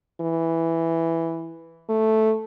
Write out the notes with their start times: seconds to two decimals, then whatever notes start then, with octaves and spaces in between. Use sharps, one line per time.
0.21 E3
1.89 A3